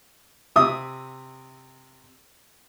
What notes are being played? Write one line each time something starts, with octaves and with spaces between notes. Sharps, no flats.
C3 E5 D#6